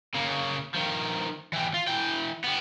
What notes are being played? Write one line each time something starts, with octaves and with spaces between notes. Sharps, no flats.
C#3 A#3
D#3 F3
E3 G4
F4
E3 G5
G3 B3